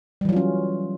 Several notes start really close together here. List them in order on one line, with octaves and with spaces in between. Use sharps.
G3 E3 F#3 F4 C#4